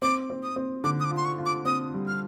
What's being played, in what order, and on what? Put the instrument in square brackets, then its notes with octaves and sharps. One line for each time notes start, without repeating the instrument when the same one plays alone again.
[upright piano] C4 [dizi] D6
[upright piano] C4
[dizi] D#6
[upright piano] C4
[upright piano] D3 [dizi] D6
[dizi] D#6
D6
[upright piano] F4
[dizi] C6
C#6
[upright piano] F4
[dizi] D6
[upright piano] C4 [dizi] D#6
[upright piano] G3
[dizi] F6